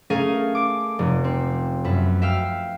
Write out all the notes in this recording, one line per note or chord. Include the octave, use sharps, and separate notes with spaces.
A3 C#4 G#4 A#4 F5 G#5
D6 D7
F1
C4
F#2 B4 E5
E5 F5 G5 E6 F6